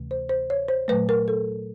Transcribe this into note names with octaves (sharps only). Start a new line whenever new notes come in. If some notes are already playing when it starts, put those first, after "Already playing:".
Already playing: D2 C3 E3 A3
C5
C5
C#5
C5
A#2 F#3 A3 B4
A#4
A4